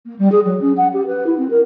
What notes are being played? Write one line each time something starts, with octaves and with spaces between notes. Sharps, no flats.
A#3
G3
G#4
F#3
C#4
F#5
G4
B4
E4
C4
A#4